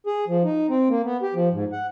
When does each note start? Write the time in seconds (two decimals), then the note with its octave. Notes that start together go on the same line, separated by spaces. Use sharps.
0.06 G#4
0.27 F3
0.44 D#4
0.69 C4
0.89 A#3
1.04 B3
1.22 G4
1.34 F3
1.52 G#2
1.72 F#5